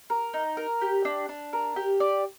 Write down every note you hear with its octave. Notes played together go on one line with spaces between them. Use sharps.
A#4
D#4
A#4
G4
D4
D4
A#4
G4
D5